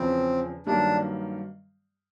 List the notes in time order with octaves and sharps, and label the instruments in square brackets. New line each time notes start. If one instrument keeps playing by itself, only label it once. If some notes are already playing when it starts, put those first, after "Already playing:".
Already playing: [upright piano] E2 C#3 F3 [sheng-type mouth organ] C4
[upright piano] G2 D#3 F#3 A#3 [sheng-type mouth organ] D4